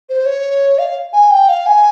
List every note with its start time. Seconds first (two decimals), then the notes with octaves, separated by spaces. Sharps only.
0.09 C5
0.26 C#5
0.79 F5
1.13 G#5
1.31 G5
1.49 F5
1.66 G#5